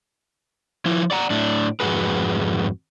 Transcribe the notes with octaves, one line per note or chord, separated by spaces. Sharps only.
F3 E4
D5 F#5 A#5
A2 D4
F2 G#2 C#3 F#4 G#4 B4